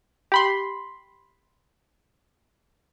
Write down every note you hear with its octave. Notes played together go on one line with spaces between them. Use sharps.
G4 B5 C6